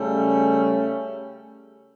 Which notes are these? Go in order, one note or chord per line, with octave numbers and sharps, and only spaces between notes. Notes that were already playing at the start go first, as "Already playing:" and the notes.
Already playing: C#3 G3 A3 C#4